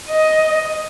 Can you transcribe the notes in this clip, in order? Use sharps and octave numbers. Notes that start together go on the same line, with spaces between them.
D#5